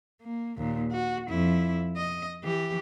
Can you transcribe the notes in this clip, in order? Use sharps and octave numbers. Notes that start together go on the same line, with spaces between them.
A#3
D#2 A#2
F#4
F2 E4
D#5
E3 G4